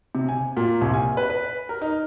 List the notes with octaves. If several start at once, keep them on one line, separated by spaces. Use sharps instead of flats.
C3
G#5
A#2
C2
G#5
B4
B4
A#4
D#4